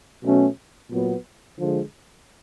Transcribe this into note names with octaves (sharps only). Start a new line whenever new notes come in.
B2 F#3 A3 C#4
A#2 F#3 B3
D3 F3 G#3